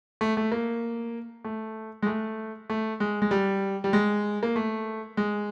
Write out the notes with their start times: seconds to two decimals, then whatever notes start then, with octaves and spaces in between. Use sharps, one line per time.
0.21 A3
0.37 A3
0.52 A#3
1.45 A3
2.02 G#3
2.07 A3
2.70 A3
3.00 G#3
3.22 G#3
3.31 G3
3.84 G3
3.93 G#3
4.43 A#3
4.56 A3
5.17 G#3